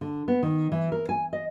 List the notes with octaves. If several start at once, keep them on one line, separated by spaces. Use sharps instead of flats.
D3
B3
D#3
E3
A#4
G#5
D#5